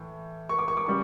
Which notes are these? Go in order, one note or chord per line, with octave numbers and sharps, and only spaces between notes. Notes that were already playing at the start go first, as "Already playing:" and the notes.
Already playing: A2 E3
C#6
D6
C#6
D6
C#3 G3 C#6